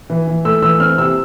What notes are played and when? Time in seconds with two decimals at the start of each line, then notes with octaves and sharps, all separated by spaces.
0.10 E3
0.27 E3
0.45 A3 E6
0.62 E3 E6
0.80 C4 F6
0.98 C3 E6